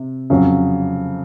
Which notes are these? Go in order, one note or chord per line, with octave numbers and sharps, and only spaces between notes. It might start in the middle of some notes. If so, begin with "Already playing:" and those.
Already playing: C3
F2 C#3 F#3